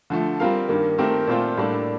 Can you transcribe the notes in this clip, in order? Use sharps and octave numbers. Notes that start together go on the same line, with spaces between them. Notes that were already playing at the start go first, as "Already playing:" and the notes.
D3 F3 A3
G3 C4 F4 A#4 F5
G2 D#3 G3 A#3
D#3 A3 C4 G4 A#4
A#2 A3 C4 F4 C5
A2 G3 A#3 D4 A4